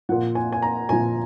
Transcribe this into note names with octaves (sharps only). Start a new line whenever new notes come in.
A#2 F3 F#5
G#5
G#5
A#5
A#2 F3 G#5